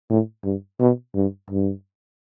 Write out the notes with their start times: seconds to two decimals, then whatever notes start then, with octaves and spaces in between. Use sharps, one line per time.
0.09 A2
0.44 G2
0.79 B2
1.15 G2
1.50 G2